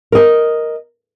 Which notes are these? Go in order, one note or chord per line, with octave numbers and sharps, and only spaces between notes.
A#4 D#5